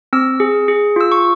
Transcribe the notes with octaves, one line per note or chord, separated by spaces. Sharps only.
C4 E6
G#4
G#4
F4 E6
C#6